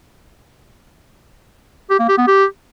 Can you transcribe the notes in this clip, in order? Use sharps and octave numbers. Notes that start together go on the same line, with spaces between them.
G4
A#3
G4
B3
G4